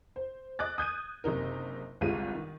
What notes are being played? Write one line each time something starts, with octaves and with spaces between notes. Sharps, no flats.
C5
D#5 D6 F#6 A6
D#6 G6 G#6 D#7
F#1 C3 D#4 A#4
G1 C2 G3 G#3 F4 D#7
D#3